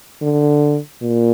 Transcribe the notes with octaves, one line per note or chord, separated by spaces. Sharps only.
D3
A#2